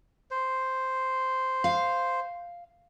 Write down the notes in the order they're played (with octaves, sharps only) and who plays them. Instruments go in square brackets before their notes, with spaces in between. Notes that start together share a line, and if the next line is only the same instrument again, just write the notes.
[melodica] C5
[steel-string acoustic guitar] F5